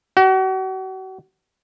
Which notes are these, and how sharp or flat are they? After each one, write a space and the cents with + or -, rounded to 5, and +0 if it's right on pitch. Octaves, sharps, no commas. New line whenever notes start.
F#4 +40